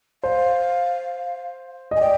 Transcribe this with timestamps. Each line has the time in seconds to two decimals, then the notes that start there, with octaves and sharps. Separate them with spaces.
0.23 C5 F5
1.91 D#5
1.96 G#5
2.01 D5 G5